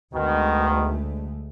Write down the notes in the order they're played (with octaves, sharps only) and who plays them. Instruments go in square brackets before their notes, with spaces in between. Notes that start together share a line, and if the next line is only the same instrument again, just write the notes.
[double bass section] D2 G#3 A3 [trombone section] B2 D#3